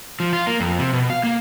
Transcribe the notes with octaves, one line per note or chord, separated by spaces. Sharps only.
F3
F4
A#3
F2
C3
B2
F5
A#3